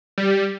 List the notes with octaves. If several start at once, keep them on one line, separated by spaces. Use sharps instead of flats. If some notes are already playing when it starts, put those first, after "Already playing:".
G3